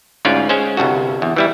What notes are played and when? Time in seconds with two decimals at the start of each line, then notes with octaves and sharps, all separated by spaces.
0.25 D2 G#2 C#4 F4 D5
0.49 G#3 C#4 C5
0.77 G1 C2 G2 F#4
1.22 E2
1.36 E3 G3 E4